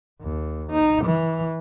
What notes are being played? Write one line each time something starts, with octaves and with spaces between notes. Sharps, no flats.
D#2
D#4
E3